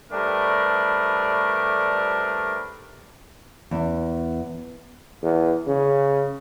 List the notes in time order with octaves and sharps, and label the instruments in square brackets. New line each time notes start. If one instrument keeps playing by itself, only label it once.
[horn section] C3 G3 A3 D4 A#4 B4
[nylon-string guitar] E2
[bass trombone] E2
C#3